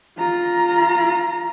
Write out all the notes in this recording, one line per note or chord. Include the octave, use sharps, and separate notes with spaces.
F4 A#5